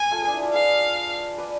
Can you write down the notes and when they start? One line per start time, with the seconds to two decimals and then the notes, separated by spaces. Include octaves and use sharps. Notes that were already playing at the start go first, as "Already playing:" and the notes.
Already playing: G#5
0.11 F4 A4
0.22 G#4 B4
0.27 D4
0.33 E4
0.43 D4 F4
0.53 G#4 B4 F5
1.38 B4 D5